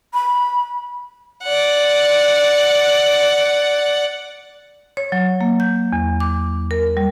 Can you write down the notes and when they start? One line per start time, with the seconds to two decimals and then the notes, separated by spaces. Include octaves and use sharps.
0.14 B5
1.43 D5 F#5
4.97 C#5
5.12 F#3
5.41 A#3
5.60 G6
5.93 E2
6.20 D6
6.71 A#4
6.97 G3